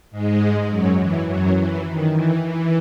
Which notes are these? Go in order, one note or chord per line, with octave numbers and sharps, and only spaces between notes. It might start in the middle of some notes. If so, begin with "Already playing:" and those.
G#2 G#3
F#2 F#3
E3
F#2 F#3
E3
D#3
E3
E3